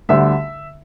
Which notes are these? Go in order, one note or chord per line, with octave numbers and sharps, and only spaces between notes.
D2 D3 G3 E5